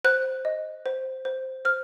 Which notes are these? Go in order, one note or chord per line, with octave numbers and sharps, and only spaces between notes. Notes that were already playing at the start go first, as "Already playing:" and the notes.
C5 F#6
D#5
C5
C5
C5 F6